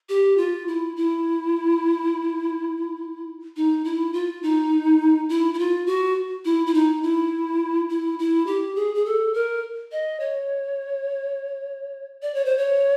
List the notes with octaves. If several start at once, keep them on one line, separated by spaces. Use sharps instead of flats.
G4
F4
E4
E4
D#4
E4
F4
D#4
E4
E4
F4
F#4
E4
E4
D#4
E4
E4
E4
G4
G#4
G#4
A4
A#4
D#5
C#5
D5
C#5
C5
C#5